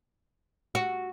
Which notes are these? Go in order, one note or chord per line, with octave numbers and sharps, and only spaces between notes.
F#4